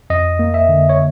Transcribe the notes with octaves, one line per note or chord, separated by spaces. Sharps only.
F2 D#5
A#3
E5
D3
C#5